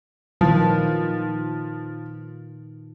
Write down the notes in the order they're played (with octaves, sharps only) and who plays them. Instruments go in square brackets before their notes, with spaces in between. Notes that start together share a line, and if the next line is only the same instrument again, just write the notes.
[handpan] A#2 D#3 B4 [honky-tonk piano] F3